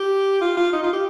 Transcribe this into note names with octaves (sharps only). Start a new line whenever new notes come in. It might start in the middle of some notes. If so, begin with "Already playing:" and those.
Already playing: G4
F4
F4
D#4
F4
G4